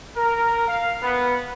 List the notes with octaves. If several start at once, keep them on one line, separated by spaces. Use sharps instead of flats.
A#4
F5
B3